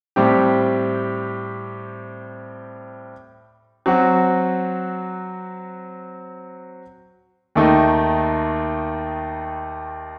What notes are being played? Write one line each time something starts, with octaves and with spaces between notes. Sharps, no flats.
A2 G3 C4 G4
F#3 C4 F#4
D#2 D#3 A3 D#4